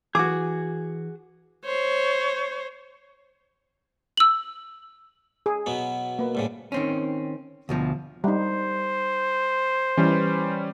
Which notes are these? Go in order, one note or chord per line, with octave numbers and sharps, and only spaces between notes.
E3 F#4 G#4 D6
C5 C#5
E6 F#7
G#4
B2 F#3 B3
A#3 B4
C2 A2 C#3
D#3 C4 C#4
D2 B2 F3
G3 D#4 C5
E3 G3 C#4